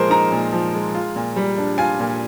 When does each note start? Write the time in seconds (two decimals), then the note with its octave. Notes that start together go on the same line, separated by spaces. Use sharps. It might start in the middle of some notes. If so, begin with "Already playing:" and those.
Already playing: A#2 F3 G#3 A#4 C5
0.10 D#4 A#5
0.32 A#2
0.53 F3
0.74 G#3
0.94 F4
1.16 A#2
1.36 G3
1.58 D4
1.78 F4 G#5
2.00 A#2